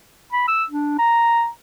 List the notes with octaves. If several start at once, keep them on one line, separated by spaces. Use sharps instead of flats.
B5
E6
D4
A#5